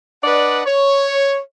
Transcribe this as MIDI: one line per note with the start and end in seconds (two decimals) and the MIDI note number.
0.24 0.62 62
0.24 0.62 71
0.24 0.62 74
0.24 0.62 75
0.24 0.62 78
0.66 1.37 73